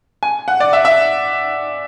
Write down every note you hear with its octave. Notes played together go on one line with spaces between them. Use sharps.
G#5
F#5
D5
E5
E5